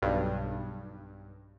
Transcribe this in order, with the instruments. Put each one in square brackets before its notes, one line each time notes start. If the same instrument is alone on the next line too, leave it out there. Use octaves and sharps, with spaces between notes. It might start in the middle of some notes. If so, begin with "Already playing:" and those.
[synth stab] B1 G2